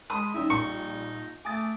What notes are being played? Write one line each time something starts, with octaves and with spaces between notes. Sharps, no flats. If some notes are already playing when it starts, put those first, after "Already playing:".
G#3 A5 B5 C6 D#6
G3 C#4 D#4 E4 E5
A#1 D#4 C#6
A3 G#5 D6 D#6 A6